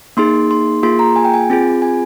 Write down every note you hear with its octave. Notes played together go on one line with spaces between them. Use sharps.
A#3 D#4 G#4 C6
C6
A#3 F4 G#4 C6
A#5
G#5
G5
G#5
C4 F4 G#4
G#5